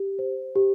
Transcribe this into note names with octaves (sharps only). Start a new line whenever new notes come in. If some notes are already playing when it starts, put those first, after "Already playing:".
Already playing: G4
C5
G4